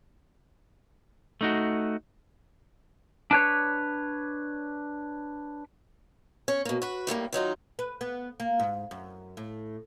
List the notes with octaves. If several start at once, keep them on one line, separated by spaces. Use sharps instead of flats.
A3 D#4 F#4
D4 B4 C#5
C#4 C#5
B2 A#3
F#4 B4
A2 G3 A3 A#3
D#3 F#3 D#4 F4
B4
B3
A#3
G#2
F#2
A2